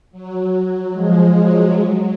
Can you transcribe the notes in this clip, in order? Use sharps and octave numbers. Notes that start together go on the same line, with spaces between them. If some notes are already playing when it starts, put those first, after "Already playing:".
F#3
F3 G#3
F#3
F#3